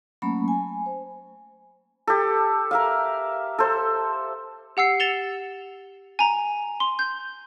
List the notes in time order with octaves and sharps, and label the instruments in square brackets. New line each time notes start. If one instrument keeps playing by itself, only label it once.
[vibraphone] F#3 A3 A#3 C#4 A5 B5
G#5
C5
[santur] G4 A4
A#4 E5 F5
A4 C5
[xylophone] G4 F#5 E6 C7
A6 C#7 E7 F7 G7
G#5 A#5
C6
G6